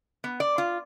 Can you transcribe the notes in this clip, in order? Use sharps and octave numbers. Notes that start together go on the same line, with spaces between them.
B3
D5
F4